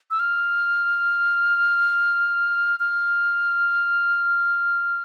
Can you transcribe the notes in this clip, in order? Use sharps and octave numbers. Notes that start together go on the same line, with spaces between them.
E6
F6
F6